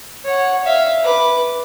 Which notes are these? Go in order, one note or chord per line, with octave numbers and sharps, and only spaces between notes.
C#5 F#5
E5 F5
B4 D6